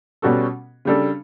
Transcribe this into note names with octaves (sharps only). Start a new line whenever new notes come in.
B2 G3 C#4 F#4 A4
C#3 G3 D4 A4